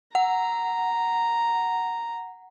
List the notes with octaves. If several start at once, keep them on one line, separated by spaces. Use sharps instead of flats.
F#5 A#5